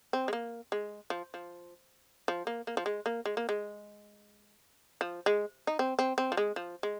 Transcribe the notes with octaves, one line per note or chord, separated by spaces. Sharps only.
C4
G#3
A#3
G#3
F3
F3
F3
A#3
A#3
F3
G#3
A#3
G#3
A#3
G#3
F3
G#3
D#4
C4
C4
C4
F3
G#3
F3
G#3